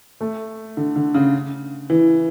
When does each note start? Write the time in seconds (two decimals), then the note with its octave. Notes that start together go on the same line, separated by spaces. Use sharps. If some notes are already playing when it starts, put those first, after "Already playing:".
0.21 A3
0.77 D3
0.96 D3
1.15 C#3
1.90 E3